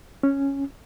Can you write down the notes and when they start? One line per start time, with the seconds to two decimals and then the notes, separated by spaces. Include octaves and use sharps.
0.23 C#4